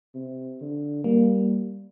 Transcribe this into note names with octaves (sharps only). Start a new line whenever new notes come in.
C3
D3
G3 A#3